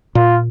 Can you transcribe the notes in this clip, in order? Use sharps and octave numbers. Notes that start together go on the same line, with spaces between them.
A#2 F4